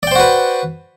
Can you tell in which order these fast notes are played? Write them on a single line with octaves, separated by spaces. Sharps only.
D5 G5 C5 F#4 B4